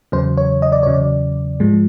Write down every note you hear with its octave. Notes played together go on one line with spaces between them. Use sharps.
E2 C#3 F#3 C5
C#5
D#5
D5
E2 C#3 F#3 C#5
D5
G#2 F3 G#3